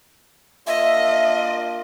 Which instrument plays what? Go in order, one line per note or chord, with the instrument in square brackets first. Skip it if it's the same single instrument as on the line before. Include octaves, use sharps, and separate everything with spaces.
[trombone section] A#3 D4 F4 [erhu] D#5 [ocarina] E5